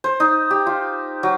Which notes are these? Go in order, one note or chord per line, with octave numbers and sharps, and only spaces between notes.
C5
D#4
G4
F4
F#3